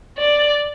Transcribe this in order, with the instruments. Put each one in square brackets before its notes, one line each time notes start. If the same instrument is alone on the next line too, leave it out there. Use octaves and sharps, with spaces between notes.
[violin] D5